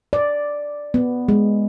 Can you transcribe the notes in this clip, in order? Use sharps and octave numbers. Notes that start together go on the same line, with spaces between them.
D5
B3
G#3